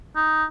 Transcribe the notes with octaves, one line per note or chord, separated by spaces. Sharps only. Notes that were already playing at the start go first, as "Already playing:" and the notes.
D#4